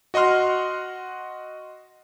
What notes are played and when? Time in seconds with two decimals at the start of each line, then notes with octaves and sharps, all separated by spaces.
0.14 F#4 D#5 F#5 C6 F6